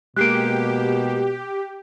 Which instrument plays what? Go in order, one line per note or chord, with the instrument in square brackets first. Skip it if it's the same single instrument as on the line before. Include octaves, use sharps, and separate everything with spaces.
[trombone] B2 [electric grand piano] G#3 A#3 [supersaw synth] G4 [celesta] F#6 C7 D7